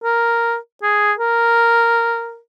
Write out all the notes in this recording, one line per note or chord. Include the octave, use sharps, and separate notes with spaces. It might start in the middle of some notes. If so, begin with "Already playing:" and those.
A#4
G#4
A#4